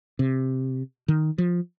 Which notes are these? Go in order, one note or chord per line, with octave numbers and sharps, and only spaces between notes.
C3
D#3
F3